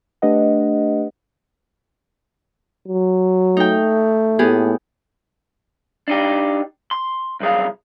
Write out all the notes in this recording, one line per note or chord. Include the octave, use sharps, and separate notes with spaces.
A3 D4 G4 B4 D#5 F#5
F#3
A3 D#4 G5
A2 B3 G4 G#4
D4 D#4 G4
C6
C2 F#2 G#4 F5